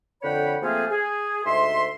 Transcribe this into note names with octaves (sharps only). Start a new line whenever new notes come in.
F2 D3 C#5 F#5 G5 B5
F3 A3 A#3 C4 F4 G#4
G#4
D2 G#2 E5 C6